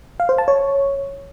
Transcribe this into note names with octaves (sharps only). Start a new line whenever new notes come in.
F5
C5
A5
C#5